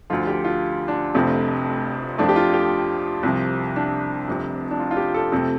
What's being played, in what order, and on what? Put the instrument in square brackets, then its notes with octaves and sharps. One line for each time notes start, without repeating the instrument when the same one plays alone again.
[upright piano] D2 D3 F3 F4
G4
F4
D4
F1 F2 C3 F3 A3
F2 F3 A3 D4
G4
F4
G4
C2 C3 F3
D4
F1 F2 C3
D4
F4
F4
G4
A4
F2 C3 A3 A4